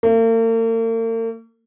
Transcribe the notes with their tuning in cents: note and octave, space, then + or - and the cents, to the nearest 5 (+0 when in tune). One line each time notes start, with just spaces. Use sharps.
A#3 -45